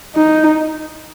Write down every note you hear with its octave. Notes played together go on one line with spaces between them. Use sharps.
D#4